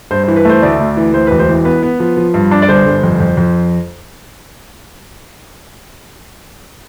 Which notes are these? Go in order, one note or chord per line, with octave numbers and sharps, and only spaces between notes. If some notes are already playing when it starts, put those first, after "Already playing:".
G2 C5
E3 C5
B4
A3 C5
D2 D5
D2
E3
D2 C5
E1 B4
C5
E3
B3 B4
B3
F3
F3
G2
D4
D5
G1 C5
G1
F2
F2
F2